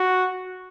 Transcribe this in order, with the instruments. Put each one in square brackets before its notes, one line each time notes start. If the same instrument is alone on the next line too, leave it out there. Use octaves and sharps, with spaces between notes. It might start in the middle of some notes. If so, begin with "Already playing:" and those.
Already playing: [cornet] F#4